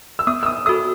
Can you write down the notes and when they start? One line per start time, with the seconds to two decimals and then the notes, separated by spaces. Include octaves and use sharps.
0.19 E6
0.27 B3 D#6
0.43 E6
0.46 D#6
0.66 F#4 A4 D#6